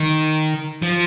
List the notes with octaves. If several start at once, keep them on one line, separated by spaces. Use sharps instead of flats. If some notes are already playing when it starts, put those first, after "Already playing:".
Already playing: D#3
F3